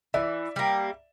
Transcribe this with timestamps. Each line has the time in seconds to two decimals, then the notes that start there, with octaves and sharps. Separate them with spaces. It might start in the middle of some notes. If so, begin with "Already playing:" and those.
0.14 E3 D5 E5
0.56 G3 A#3